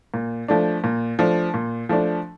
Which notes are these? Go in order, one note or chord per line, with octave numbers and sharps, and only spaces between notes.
A#2
F3 A3 D4
A#2
F3 A3 D4
A#2
F3 A3 D4